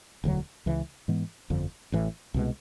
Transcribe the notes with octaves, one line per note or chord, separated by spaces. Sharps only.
E1 D2 D3 F#3
C#2 C#3 E3
G#2 E3 G#3 B3
G1 F2 D3 F3
A1 A2 E3
C2 B2 G#3